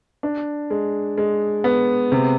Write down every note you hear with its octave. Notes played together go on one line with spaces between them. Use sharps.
D4
G#3
G#3
B3
C3